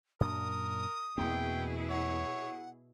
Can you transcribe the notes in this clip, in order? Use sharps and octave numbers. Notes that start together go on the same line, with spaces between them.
F#2 A#2 D4 A#4 D#6
E2 B2 A#3 C4 E4 G#4 G5
C#5 F#5